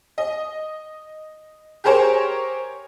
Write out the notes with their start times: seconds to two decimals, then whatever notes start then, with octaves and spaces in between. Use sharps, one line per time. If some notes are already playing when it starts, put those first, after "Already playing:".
0.18 D#5
1.84 G4 G#4 A#4 C5 C#5